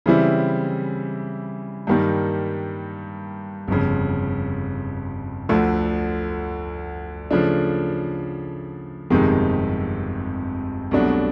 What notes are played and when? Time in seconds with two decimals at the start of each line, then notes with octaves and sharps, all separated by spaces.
0.06 C#3 E3 G3 C4 E4
1.87 G2 D#3 G3 A#3
3.68 G1 F2 C#3
5.49 D2 D3 F3
7.31 C#3 F3 A3 D4
9.10 G1 F2 C3 D#3 G#3
10.91 C2 B2 F#3 A3 D4